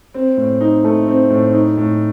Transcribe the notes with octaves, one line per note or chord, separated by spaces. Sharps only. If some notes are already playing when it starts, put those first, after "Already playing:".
C4
A2
D#4
A3
C4
A2
D#4
A2